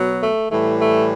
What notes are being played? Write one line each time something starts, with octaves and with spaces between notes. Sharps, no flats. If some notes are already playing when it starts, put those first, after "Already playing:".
Already playing: B2 F#3
A3
A2 E3 G3 A3
A3